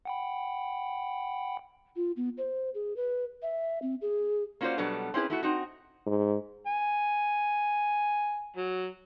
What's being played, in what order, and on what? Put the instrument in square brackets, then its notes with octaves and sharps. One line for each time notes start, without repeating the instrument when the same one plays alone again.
[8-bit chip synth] F#5 G5 B5
[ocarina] F4
B3
C5
G#4
B4
E5
C4
G#4
[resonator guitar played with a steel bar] A#3 C#4 F4 F#4 C5 D5
B2 F#3 G3 B3 D4 A4
C4 C#4 E4 G#4 B4
A3 E4 F#4
C4 D#4 F#4
[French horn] G#2
[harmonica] G#5
F#3